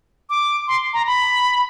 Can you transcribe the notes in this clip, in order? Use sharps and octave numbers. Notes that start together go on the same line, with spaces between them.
D6
C6
A#5
B5